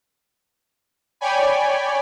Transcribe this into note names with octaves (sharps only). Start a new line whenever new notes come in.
C#5 D5 G5 G#5 B5